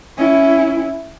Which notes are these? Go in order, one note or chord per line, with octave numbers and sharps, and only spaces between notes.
C#4 E4